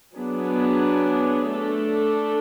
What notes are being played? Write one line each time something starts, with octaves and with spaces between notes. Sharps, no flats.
F#3 B3 D4 G#4
A3 D4 A4